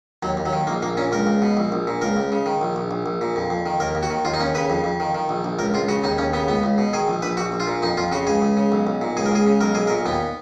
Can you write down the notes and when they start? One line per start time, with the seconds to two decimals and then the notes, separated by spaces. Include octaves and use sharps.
0.23 D#2 F#3
0.37 D#2
0.46 F#3
0.53 D#3
0.67 A#1 A#3
0.82 A#1 A#3
0.97 A#2 C#4
1.12 C#2 A#4
1.27 C#2
1.42 B2
1.57 A#1
1.72 A#1
1.87 A#2
2.01 C#2 A#4
2.17 C#2
2.32 C#3
2.46 D#3
2.61 A#1
2.76 A#1
2.91 A#1
3.06 A#1
3.21 A#2
3.36 F2
3.50 F2
3.66 D#3
3.80 D#2 A#4
3.95 D#2
4.03 F#4
4.10 D#3
4.25 D#2 F4
4.34 D#4
4.40 D#2 C#4
4.55 C#3 B4
4.70 F2
4.84 F2
5.00 D#3
5.15 D#3
5.29 A#1
5.44 A#1
5.59 C#2 A#4
5.74 C#2 F4
5.88 C#3 F#4
6.04 D#2 D#4
6.18 D#2 C#4
6.33 C#3 B3
6.48 C#2 B3
6.63 C#2
6.78 B2
6.93 D#3 G#4
7.08 A#1
7.22 A#1 B4
7.37 A#1 F#4
7.52 A#1
7.60 F4
7.67 A#2
7.82 F2 D#4
7.97 F2 F4
8.12 C#3 F#4
8.27 C#2 G#4
8.42 C#2
8.57 C#3
8.72 B1
8.87 B1
9.01 A#2
9.17 C#2 G#4
9.26 A#4
9.32 C#2 G#4
9.46 C#3
9.61 B1 A#4
9.75 B1 G#4
9.87 A#4
9.90 A#2
10.06 D#2 B3